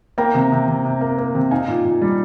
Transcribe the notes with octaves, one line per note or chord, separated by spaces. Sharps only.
A#3 G5 A#5
C3
C3
C3
C3
A#3
A#3
C3
D#4 F5 G#5
A#2
A#2
G3